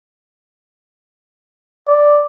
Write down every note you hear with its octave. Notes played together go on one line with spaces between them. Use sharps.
D5